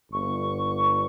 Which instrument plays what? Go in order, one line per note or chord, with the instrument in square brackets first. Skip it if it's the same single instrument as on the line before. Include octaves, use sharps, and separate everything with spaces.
[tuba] G1 [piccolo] C#6